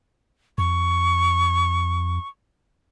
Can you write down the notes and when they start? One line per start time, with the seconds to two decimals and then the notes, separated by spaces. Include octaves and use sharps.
0.58 F2 C#6